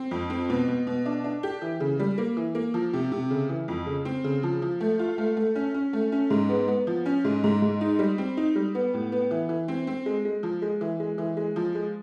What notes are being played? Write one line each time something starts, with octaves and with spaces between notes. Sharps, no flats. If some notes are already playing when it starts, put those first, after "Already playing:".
Already playing: C4
F2
C4
B2
B2
B2
D4
D4
G4
E3
C#3
G3
A#3
E3
A#3
F3
C3
C3
C#3
E3
F2
C#3
C4
C#3
F3
F3
A3
F4
A3
A3
C#4
C#4
A3
C#4
G#2
B3
B3
F3
C#4
G#2
G#2
G#2
D#4
G3
C4
D#4
G3
B3
A2
B3
E3
E3
C4
C4
G#3
G#3
F3
G#3
E3
G#3
E3
G#3
F3
G#3